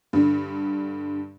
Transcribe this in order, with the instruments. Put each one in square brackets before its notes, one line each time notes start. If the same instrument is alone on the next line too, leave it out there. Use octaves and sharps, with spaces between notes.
[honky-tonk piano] G2 D3